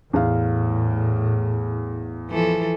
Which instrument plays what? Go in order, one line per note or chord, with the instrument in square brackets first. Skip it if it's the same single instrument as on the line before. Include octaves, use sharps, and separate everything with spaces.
[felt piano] E2 F5 [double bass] A2
[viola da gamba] E3 F3 A4